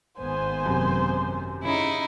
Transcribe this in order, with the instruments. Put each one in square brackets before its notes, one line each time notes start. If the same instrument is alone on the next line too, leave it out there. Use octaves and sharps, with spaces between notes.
[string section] G#1 B3 G#5 [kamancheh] C5
[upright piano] F#2 C3
[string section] C#3 [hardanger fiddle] D#4 E4